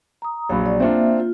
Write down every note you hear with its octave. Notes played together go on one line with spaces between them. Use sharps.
A#5 D#6
A#1 F#3 F5 B5
D5
A#3 C4 D4 F4 E5
F4